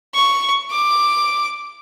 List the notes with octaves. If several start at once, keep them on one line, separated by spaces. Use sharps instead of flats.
C#6
D6